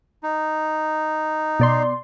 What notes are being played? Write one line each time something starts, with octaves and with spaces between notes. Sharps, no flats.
D#4
B2 D5 C6